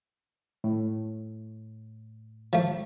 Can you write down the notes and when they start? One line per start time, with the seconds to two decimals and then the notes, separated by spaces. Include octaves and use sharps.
0.64 A2
2.53 F3 A3